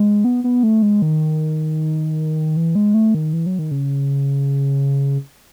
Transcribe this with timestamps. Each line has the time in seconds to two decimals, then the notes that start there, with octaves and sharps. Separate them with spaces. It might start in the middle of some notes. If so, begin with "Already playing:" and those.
Already playing: G#3
0.24 B3
0.44 B3
0.63 A3
0.82 G#3
1.02 D#3
2.57 E3
2.75 G#3
2.94 A3
3.14 D#3
3.33 E3
3.46 F#3
3.59 D#3
3.71 C#3